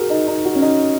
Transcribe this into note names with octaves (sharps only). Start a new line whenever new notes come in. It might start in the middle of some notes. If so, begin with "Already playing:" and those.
Already playing: F#4 G#4 A#4
D#4
D#4
F#4
C#4
D#4